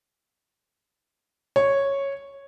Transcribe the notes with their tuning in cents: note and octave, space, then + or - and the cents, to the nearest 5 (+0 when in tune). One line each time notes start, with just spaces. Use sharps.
C#5 -5